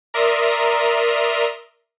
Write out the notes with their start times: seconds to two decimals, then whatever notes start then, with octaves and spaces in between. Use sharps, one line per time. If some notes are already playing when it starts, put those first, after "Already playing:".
0.14 A#4 D5 E5 A#5 C6 D#6